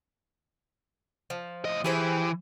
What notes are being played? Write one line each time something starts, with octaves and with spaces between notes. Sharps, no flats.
F3
A2 D#5
E3 G4 G#4 C5